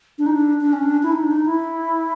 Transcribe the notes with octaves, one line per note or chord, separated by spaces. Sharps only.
D4
D#4
D4
D4
C#4
D4
E4
D#4
D4
D#4
E4